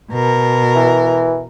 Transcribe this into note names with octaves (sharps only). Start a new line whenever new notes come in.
B2 A#4
E3